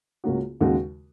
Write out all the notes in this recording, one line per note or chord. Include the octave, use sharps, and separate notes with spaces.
C#2 C#3 A#3 C#4 F#4
D#2 C#3 G#3 F#4